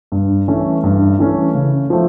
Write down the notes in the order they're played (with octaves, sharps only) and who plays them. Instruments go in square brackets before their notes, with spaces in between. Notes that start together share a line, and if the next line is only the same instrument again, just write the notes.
[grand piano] G2
E3 A3 C#4
G2
E3 A3 C#4
C#3
F3 A3